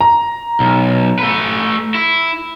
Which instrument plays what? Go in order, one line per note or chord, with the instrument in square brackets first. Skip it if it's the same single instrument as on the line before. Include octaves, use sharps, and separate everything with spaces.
[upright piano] A#5
[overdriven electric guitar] B1
A3 B4
E4